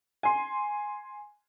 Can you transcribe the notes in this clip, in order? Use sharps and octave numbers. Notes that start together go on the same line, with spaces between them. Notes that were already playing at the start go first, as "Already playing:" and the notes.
G#5 C6